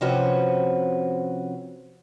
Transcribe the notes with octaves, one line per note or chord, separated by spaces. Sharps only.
C3 F3 C4 C#4 F#4 B4